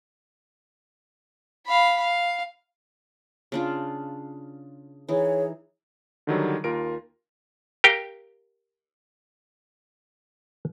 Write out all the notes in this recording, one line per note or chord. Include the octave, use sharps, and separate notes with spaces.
F5 B5
F5
C#3 D4 F4
E3 D#4 G#4 C#5
D3 D#3 F#3 G3
D#2 F4 A#4 D7
G4 A#4 F5 G5